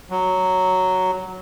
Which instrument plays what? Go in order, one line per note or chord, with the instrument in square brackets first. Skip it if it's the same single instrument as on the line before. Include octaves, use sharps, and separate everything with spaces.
[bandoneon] F#3